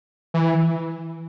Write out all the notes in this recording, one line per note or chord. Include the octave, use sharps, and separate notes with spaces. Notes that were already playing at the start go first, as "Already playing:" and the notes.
E3